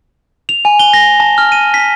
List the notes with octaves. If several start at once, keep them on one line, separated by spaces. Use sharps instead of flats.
F7
G#5
G7
A#6
A5
F6
D#7
B6